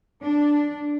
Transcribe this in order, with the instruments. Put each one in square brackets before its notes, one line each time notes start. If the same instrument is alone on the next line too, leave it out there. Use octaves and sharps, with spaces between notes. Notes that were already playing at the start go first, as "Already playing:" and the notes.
[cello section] D4